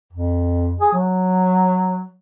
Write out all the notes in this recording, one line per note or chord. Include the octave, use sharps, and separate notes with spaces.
F2
G#4
F#3